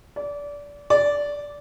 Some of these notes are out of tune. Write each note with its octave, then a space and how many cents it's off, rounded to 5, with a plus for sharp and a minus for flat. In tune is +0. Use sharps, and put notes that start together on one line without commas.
D5 -25
D5 -15